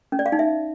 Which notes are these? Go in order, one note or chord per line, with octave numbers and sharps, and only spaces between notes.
C#4
D5
F5
D#4
E5